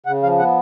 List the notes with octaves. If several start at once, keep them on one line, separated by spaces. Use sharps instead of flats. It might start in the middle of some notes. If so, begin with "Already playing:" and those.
C#3 F#5
F3 F5
B3 F#5